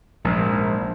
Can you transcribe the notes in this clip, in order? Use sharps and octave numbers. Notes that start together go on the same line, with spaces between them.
A#1 G#2